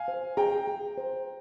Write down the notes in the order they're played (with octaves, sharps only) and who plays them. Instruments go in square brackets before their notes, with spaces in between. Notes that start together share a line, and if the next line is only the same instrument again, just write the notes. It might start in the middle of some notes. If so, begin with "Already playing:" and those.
Already playing: [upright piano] F5 G#5
[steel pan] C5
[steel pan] G#4 [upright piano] G5 A#5
[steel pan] G#4
C5